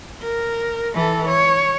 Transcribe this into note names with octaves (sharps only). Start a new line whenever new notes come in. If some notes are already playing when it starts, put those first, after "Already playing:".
A#4
E3 A4
C#5